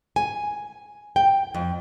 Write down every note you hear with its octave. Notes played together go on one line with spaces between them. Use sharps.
G#5
G5
F2